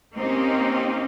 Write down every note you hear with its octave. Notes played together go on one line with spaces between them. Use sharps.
A#3 C4 C#4 D#4 G4